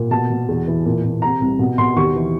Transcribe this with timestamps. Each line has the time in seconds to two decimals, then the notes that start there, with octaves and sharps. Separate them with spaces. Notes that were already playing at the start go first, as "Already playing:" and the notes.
Already playing: A#2
0.11 B2 A5
0.30 B2
0.48 E2
0.68 E3
0.85 A#2
1.04 A#2
1.22 C3 A#5
1.41 C2
1.59 B2
1.78 B2 C6
1.96 D#2 C#6
2.16 E3